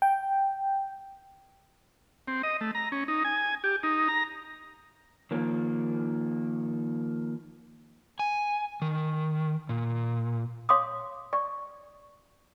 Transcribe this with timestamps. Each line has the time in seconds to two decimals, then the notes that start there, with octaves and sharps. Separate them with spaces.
0.02 G5
2.28 C4
2.43 D#5
2.61 A3
2.75 A#5
2.92 C#4
3.08 D#4
3.25 G#5
3.64 G4
3.83 D#4
4.08 A#5
5.31 D#3 F3 A#3
8.19 G#5
8.82 D#3
9.69 A#2
10.69 C#5 F5 C6 D6 D#6
11.33 D5 C#6